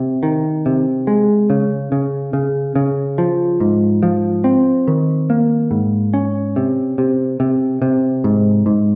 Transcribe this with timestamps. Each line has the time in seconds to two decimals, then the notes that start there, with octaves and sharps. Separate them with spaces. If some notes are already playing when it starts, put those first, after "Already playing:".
Already playing: C3
0.23 D#3
0.66 C3
1.07 G#3
1.50 C#3
1.92 C#3
2.33 C#3
2.76 C#3
3.18 F3
3.60 G#2
4.03 F3
4.44 C4
4.88 D#3
5.30 A#3
5.71 G#2
6.14 C#4
6.56 C3
6.98 C3
7.40 C3
7.82 C3
8.24 G#2
8.66 G#2